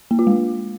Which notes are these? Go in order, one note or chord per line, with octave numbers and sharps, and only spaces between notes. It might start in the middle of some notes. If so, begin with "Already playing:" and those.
A#3
F4
G#3